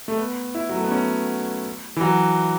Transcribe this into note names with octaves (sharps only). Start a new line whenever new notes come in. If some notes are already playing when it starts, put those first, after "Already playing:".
A3
B3
E4
F#3
A3
B3
C#4
E3
F#3